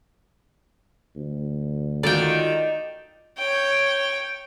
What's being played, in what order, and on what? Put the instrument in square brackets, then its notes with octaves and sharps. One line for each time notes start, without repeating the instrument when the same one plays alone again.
[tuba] D2
[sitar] D#3 [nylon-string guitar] F4 F#4 A4 [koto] D5 G5
[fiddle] C#5 G5